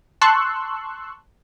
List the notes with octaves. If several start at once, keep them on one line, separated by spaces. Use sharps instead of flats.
A5 C6 C#6 E6 F#6